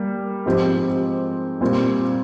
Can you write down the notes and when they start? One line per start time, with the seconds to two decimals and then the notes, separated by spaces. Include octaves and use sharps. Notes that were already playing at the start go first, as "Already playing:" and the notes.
Already playing: G3 A#3
0.46 G#2 F3 C4 G4
1.61 A#2 G3 C4 F4